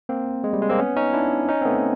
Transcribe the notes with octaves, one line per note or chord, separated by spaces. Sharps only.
A#3 C4
G#3
G3
G#3
A#3 C4
B3 C#4
C#4 D#4
D4 E4
C#4 D#4
C4
A3 B3